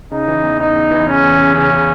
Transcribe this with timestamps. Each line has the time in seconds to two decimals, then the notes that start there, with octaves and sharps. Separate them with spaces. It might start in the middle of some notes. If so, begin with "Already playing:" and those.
0.11 C#3 D#4
0.28 E3
0.43 E2
0.59 E2 D#4
0.76 E2
0.91 E3
1.07 C#3 C#4
1.23 E2
1.39 C#3
1.55 C#3 C#4
1.71 C#3